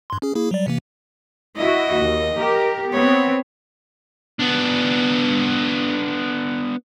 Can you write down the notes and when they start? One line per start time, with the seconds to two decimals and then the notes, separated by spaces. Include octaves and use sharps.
0.10 G2 C6
0.22 C#4 G#4
0.35 A#3 E4 G#4
0.51 F#3 G3 D5
0.67 C3 E3 A#3
1.56 E4 F#4 D#5
1.98 D#2
2.36 G4 A#4
2.92 B3 C4 C#5
4.39 B3 D4